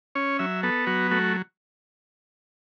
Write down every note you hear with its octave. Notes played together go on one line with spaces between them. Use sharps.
C#4 C#5
F#3 E5
B3 A4
F#3 F#4
A3 F#4